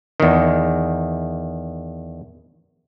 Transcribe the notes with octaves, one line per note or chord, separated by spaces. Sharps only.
E2 D#3